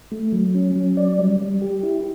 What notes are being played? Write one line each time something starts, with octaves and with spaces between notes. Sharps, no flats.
A3
F#3
C#4
F#3
D5
G3
G3
G4
E4